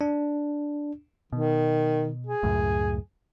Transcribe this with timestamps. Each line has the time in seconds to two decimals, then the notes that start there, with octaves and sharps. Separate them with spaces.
0.01 D4
1.33 B2 D#3
2.26 G#4
2.43 C#2 F#2 A2